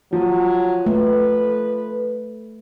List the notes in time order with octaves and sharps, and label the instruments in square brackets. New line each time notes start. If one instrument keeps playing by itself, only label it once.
[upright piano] F3 [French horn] F#3
[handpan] A3 [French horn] B4